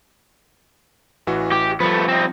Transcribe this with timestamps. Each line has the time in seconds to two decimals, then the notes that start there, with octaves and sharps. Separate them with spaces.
1.27 A1 E3 F#4
1.51 G4
1.80 F3 G3 A3 B3 C#7
2.09 C4 D#4